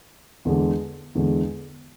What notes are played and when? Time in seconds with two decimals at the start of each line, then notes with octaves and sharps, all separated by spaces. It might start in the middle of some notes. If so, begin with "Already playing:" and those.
0.45 E2 D3 G#3
1.15 E2 D3 G#3